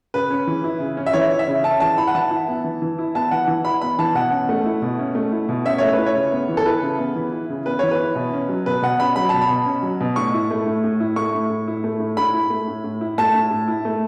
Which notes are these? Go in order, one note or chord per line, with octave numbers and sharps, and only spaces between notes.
C#3 B4
C#4
E3
E4
C#3
C#4
E5
E3 C#5
E4
E5
C#3
C#4 A5
E3 A5
E4 B5
F#5
E3 A5
E4
B3
E3
E3
E4
B3 A5
E3 F#5
E3
E4 B5
B3 B5
E3 A5
B2 F#5
C#4
A3
E4
B2
C#4
A3
E4
B2
C#4 E5
A3 C#5
B4
E4
C#5
C#3
B3
E3
A4
E4 B4
C#3
B3
E3
E4
C#3
B3 B4
E3 C#5
B4
E4
B2
C#4
F#3
B2 B4
B2 F#5
C#4 B5
F#3 B5
B2 A5
B5
B2
C#4
F#3
B2
A2 C#6
E4
A3
A2
A2
E4
A3 C#6
A2
A2
E4
A3
A2
A2 B5
E4
A3
A2
A2
E4
A3 A5
A2
A2
E4
A3